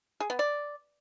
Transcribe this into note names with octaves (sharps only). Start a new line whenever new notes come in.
G#4
B3
D5